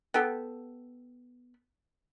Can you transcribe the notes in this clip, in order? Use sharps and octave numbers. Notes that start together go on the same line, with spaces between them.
B3 G4 A4